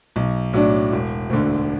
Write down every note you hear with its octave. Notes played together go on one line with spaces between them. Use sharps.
B1
A2 F#3 D4
E1
D2 D3